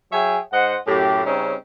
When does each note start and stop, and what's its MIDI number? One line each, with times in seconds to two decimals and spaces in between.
0.12 0.38 54
0.12 0.38 68
0.12 0.38 73
0.12 0.38 76
0.12 0.38 79
0.12 0.38 80
0.53 0.77 44
0.53 0.77 72
0.53 0.77 75
0.53 0.77 78
0.87 1.23 42
0.87 1.23 45
0.87 1.23 67
1.25 1.55 49
1.25 1.55 55
1.25 1.55 60
1.25 1.55 61
1.25 1.55 63